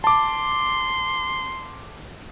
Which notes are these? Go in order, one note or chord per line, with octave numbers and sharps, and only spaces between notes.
A5 C6 D6